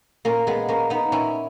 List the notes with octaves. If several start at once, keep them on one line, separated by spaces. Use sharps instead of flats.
A#2 A#3 C#4
G#3 B3
A#3 C#4
B3 D#4
A#2 C#4 E4